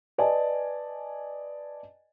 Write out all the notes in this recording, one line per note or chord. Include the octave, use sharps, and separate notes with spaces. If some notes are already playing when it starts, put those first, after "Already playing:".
B4 D5 D#5 G#5 A5